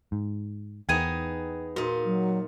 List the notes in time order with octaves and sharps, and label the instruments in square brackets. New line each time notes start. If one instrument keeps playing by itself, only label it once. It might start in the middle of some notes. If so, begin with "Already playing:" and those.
[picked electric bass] G#2
[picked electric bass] E2 [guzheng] B3 D#4 G#4 [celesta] G5 G#6 D#7
[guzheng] A#2 D#4 [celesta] F#4
[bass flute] F#3